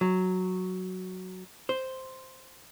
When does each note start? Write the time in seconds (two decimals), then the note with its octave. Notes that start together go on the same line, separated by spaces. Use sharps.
0.01 F#3
1.69 C5